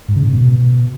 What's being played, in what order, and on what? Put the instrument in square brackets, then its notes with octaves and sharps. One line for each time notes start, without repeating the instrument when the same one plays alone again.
[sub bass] G#2
C#3
A2
B2